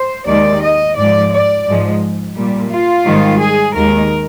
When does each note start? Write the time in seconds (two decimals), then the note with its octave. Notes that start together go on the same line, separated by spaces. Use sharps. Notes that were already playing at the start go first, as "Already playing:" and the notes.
Already playing: C5
0.27 D#2 D#3 G#3 D5
0.61 D#5
0.96 G#2 F3 G#3 D5
1.32 D5
1.66 G#2 F3 G#3
2.36 A#2 G3
2.70 F4
3.05 G#2 D#3 G3
3.41 G#4
3.75 D#2 D#3 G#3 A#4